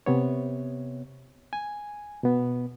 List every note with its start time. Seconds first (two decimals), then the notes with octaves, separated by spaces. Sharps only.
0.06 C3 B3 C#5
1.53 G#5
2.23 B2 B3